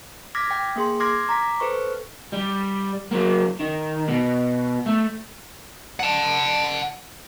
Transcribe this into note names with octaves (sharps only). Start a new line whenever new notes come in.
D6 F6 G#6 A#6 B6
G5
A#3 G#4 C6
C6 D6 F6 G#6 A#6 C7
A#5 D6 B6
A4 B4 C5 C#6
G3
F#3 A#3
D#3
B2
A3
F#5 A5